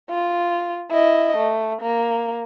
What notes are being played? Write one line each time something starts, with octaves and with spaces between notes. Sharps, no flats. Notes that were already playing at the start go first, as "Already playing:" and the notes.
F4
E4 D#5
A3
A#3